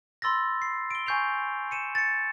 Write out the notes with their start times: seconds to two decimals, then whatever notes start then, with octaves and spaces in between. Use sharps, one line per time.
0.22 B5 C6 E6 A6 A#6
0.62 C7
0.91 D7 G7
1.06 G#5 C#6 G6 C7 F7
1.71 C#7 D#7 E7
1.95 A6 C#7